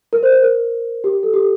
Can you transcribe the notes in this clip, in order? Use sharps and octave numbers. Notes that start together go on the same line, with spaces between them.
A#4
C5
A#4
A#4
G4
A4
G4